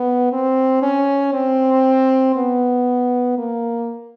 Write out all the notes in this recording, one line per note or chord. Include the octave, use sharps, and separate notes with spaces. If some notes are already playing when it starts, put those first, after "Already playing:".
Already playing: B3
C4
C#4
C4
B3
A#3